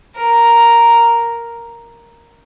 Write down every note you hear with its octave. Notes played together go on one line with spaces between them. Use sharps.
A#4